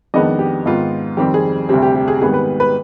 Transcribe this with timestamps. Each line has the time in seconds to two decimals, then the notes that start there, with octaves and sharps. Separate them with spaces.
0.14 F2 D#3 G#3 B3 D4 D#5
0.39 G4
0.65 G#2 D#3 B3 F4
1.17 F2 D#3 G3 C4 G4
1.34 G#4
1.69 D2 C3 G3 C4 G4
1.82 G4
1.95 G4
2.08 G#4
2.21 G#2 D#3 G3 B3 G#4
2.34 B4
2.60 B4